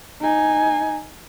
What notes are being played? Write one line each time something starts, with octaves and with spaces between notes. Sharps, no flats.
D#4 G#5